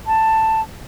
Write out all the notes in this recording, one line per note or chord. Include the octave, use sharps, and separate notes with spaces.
A5